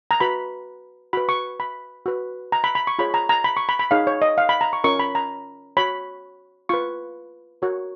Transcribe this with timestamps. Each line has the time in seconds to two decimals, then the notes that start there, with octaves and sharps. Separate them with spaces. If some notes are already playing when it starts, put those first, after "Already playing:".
0.11 A#5
0.20 F#4 B4 B5
1.13 F#4 B4 B5
1.29 C#6
1.60 B5
2.06 F#4 B4
2.52 A#5
2.64 B5
2.75 B5
2.87 C#6
2.99 F4 G#4 C#5 B5
3.14 A#5
3.29 A#5
3.44 B5
3.57 C#6
3.69 B5
3.79 B5
3.91 D#4 G#4 C#5 F5
4.07 C#5
4.22 D#5
4.38 F5
4.49 B5
4.61 A#5
4.73 C#6
4.84 C#4 F4 A#4 C#6
5.00 B5
5.15 A#5
5.77 F#4 C#5 B5
6.69 F4 B4 C#6
7.62 F#4 A#4 C#5